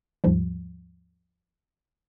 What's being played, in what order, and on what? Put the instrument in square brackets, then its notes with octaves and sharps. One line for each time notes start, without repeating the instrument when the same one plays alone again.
[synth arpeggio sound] D#2 G#2 F3 G3